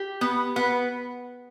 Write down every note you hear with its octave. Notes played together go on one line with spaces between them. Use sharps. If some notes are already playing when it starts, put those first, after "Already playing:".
Already playing: G4
B3
B3